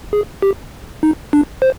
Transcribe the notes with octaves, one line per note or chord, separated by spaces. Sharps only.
G#4
G4
D#4
D4
C5